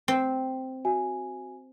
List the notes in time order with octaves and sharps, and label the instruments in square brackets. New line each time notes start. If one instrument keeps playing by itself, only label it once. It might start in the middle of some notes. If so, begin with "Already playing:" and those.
[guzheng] C4
[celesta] F#4 E5 G#5